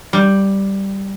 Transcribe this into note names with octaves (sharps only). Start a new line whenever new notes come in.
G3